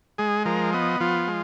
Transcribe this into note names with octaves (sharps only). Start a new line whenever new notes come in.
G#3 G#4
F3 A#4
B3 D#5
F3 F4
G#3